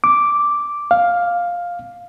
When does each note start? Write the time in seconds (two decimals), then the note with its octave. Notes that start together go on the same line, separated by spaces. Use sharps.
0.04 D6
0.91 F5